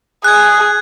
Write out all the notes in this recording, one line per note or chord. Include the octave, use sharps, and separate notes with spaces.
G#4 F#6 G#6